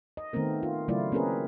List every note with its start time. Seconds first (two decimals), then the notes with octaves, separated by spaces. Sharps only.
0.17 D#5
0.33 D#3 A3 B3 C4 A#4
0.63 F4
0.88 C#3 F#3 A3 E4 F4 D5
1.12 A#3 C4 C#4 G#4 A#4 B4